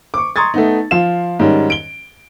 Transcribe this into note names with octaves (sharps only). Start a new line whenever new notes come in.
C#6 D6
A#5 C6 C#6 D#6 G#6 A6
A3 B3 D#4
F3 F4 F5 E7
G#2 D#3 G3 C#4
D7 G7